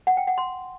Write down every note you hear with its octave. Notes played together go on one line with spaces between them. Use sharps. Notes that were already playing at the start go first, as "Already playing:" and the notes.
F#5
G5
F#5
C6